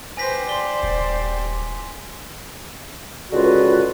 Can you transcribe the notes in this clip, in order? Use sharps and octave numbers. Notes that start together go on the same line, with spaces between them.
G4 B4 C5 G#5 A#6 B6
C5 D5 C6 G7
D#1
C#2 D3 F4 F#4 B4